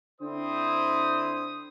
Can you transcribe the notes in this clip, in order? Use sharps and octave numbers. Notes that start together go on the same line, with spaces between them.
D3 C4 E4 C5 D#6